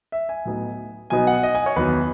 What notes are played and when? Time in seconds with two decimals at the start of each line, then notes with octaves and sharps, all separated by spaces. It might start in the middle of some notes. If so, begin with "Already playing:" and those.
0.12 E5
0.29 G#5
0.45 A2 F#3 B3 D#4
1.10 B2 F#3 B3 D#4 G#5
1.27 F#5
1.43 D#5
1.55 G#5
1.66 C#5
1.76 E2 D#3 F#3 B3 B4